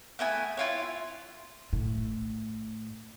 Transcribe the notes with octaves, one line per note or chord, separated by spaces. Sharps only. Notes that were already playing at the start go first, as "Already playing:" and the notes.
A3 B3 E4 G#5
E4 F4 C#5
A2